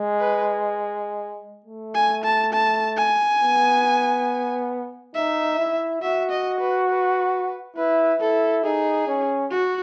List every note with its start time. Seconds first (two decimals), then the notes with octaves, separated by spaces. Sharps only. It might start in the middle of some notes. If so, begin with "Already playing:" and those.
Already playing: G#3
0.20 B4
1.66 A3
1.95 G#5
2.24 A5
2.53 A5
2.97 G#5
3.41 B3
5.15 D#4 E5
5.58 E4
6.02 F#4 E5
6.31 D#5
6.61 B4
6.90 B4
7.77 E4 B4
8.21 E4 A4
8.64 D#4 G#4
9.08 C#4
9.51 F#4